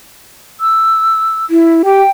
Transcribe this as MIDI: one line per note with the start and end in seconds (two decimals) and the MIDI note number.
0.60 1.45 88
1.50 1.82 64
1.85 2.02 67
1.85 2.10 79